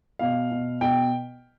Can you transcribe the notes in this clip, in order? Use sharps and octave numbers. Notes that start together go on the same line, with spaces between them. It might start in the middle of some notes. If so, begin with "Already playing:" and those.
B2 F5
B2
B2 G5